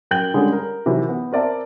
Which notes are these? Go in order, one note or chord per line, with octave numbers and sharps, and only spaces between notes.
F#2 G5 G6 F#7
D3 G3 G#3 C#4 G#4 A4
A#4
C3 D#3 E3 F#3
B3
C4 A#4 D5 E5 A5